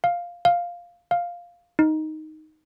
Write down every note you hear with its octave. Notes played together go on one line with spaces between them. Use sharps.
F5
F5
F5
D#4